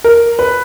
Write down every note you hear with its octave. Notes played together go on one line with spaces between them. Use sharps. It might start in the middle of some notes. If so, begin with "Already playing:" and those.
A#4
B4